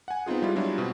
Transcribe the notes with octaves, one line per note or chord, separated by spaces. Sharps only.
F#5 G#5
B3 C4 D#4 F4 G#4
G3 G#3 E4 F4
F#3 G3 D4 E4 F4
B2 C4